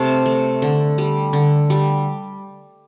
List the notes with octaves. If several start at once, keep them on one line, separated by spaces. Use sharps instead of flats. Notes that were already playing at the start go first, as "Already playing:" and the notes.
Already playing: C3 A3 F5 A5
A3
D3
G3
D3
G3